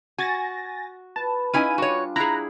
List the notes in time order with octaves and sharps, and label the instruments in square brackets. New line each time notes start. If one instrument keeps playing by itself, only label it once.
[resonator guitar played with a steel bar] F#4 [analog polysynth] G#5 A6 A#6
[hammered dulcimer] B4 [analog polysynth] A5
[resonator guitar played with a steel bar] C#4 E4 G#5 [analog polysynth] D#4 D#7 [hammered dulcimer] G#4 F5
[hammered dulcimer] G3 D4 F4 [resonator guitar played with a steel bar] F#4 C#5
[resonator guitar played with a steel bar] E4 G#4 [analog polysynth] A#5 F#6 [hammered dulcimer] B5